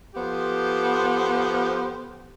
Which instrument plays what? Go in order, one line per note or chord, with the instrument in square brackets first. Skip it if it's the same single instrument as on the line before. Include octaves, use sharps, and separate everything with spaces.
[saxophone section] F3 B3 G4 A4 C5